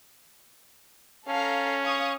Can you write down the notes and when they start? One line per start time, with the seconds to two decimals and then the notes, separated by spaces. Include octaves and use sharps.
1.28 C#4 A4 F5 A#5
1.83 F5 C#6 D#6